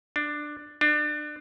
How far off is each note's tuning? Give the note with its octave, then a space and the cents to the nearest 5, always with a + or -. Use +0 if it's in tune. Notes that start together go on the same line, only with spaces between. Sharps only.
D4 +15
D4 +30